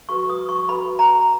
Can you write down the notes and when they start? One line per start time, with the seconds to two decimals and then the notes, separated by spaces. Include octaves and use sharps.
0.09 F#4 B4 C#6
0.30 D#6
0.49 C#6
0.69 F#4 B4 B5
0.99 A#5